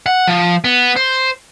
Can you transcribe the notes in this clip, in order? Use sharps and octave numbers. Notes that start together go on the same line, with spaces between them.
F#5
F3
B3
C5